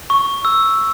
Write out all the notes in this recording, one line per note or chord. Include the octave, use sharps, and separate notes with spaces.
C#6
E6